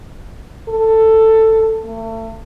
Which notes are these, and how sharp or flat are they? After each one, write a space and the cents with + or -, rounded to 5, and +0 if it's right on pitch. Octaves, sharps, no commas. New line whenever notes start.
A4 +10
A3 +35